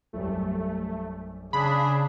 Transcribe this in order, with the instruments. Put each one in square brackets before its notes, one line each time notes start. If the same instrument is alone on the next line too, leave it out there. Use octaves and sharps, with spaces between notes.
[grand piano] A#1 F#2 G3 [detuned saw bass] A3
[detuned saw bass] C#3 [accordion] D4 G#4 [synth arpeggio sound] B5